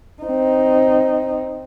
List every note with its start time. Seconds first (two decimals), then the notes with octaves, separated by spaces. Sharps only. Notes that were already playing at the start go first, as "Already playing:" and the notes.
0.22 C4 D#4